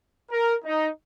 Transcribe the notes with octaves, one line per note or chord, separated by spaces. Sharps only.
A#4
D#4